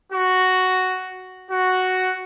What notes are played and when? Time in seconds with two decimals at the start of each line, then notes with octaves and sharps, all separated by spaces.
0.13 F#4
1.51 F#4